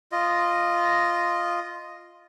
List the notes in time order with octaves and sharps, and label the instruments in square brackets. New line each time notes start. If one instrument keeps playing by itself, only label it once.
[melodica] F4 D#5